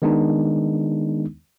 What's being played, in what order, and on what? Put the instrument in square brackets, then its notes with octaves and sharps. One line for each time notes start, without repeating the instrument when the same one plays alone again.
[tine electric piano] D#3 G#3 B3 D4 D#4